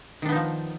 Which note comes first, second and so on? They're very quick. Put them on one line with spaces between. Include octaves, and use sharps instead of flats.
D#3 D4 B3 D#4 F3